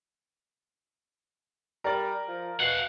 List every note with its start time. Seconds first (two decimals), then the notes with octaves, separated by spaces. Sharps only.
1.84 G3 A#4 D5
2.28 F3
2.60 B2 F5 F#5